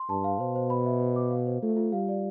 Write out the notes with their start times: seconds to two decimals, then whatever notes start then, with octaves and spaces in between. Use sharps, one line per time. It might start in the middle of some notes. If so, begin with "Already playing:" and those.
Already playing: C6
0.09 G2 A5
0.24 F5
0.40 B2 C5
0.55 C5
0.70 B5
0.86 E5
1.00 C5
1.16 D6
1.31 F5
1.46 C5
1.62 A3 F4
1.77 F4
1.93 G3 F5
2.08 D5